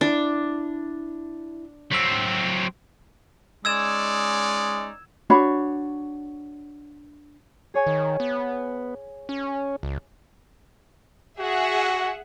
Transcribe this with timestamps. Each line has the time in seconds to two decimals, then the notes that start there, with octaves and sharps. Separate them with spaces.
0.01 D4 E4
1.92 F#3 C4 E6 B6
3.65 G#3 C#4 D#4 D5 E6 G#6 E7
5.30 D4 F#4 C#5 B5
7.74 G#4 C#5 G#5
7.87 D#3
8.20 B3
9.29 C#4
9.83 C#2
11.39 F#4 G#4 E5 F#5